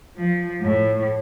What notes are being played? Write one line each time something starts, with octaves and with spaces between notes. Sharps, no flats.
F3
A2